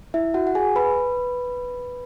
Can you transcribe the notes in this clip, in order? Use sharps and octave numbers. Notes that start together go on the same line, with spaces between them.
E4 E5
F#4 F#5
F#5
G#4 G#5
B4 B5